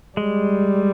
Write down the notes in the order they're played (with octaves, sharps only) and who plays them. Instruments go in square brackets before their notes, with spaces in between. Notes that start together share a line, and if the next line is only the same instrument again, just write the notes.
[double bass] G3 [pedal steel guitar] G#3